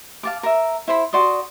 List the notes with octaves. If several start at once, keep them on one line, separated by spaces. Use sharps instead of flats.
F5 A5 D6
A#4 E5
E4 C5 B5
F#4 D5 C6 D#6